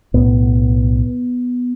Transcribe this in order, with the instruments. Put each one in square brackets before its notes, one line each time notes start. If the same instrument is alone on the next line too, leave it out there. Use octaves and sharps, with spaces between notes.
[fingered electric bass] B1 A2 B3